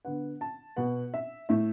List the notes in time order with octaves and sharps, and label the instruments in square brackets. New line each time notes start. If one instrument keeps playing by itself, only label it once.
[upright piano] D3 B3 F#5
A5
B2 B3 F#5
E5
A2 A3 E5